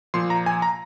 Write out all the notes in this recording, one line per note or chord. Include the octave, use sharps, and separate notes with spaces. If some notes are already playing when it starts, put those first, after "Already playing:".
A#2 F3 C6
A#5
G#5
A#5